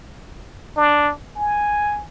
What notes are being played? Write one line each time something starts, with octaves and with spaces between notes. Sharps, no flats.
D4
G#5